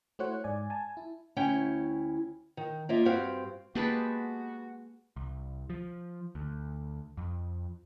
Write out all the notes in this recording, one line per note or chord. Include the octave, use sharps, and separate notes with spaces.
A3 E4 F#4 C5 C#5 F#5
G#2 D5 G#5
G#5 A5
E4
D2 C#4 E4 G5
D#3
A#3 F4 D#5 E5
G2 C4 F#4 G4 F5
G#3 A#3 B3 F#4 G4 B4 A5 B5
C2
F3
D2
F2